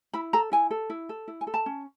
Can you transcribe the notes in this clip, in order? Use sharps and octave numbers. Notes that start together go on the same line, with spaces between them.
E4 B5
A4 A#5
E4 G#5
A4
E4
A4
E4
G#5
A4
A5
C#4